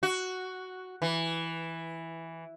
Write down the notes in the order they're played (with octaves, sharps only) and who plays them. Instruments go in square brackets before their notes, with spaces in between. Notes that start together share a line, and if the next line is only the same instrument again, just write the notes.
[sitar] F#4
E3